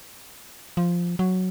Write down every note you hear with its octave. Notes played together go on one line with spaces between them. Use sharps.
F3
F#3